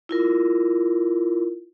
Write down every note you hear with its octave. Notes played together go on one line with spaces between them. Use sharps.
E4 F4 A#4